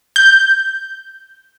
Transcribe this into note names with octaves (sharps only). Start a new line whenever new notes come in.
G6